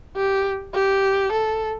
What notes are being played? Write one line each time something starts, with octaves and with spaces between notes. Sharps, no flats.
G4
G4
A4